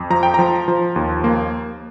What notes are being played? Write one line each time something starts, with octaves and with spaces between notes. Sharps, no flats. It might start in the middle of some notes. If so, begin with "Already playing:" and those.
Already playing: F2
F3 A#5
G5
F3 A#5
F3
D#2
A#3